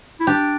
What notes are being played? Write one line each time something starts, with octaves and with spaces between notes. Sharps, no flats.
E4
D4 G4